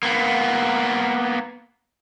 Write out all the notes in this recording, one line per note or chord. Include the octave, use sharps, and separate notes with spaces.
A#3 B3